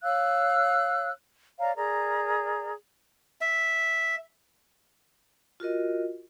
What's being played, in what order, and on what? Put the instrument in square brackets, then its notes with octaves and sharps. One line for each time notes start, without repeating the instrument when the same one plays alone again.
[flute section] C#5 F5 E6 F#6
C#5 D5 F5 A#5
G#4 A#4 D5 A#5
[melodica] E5
[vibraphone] F4 F#4 A#4 D#5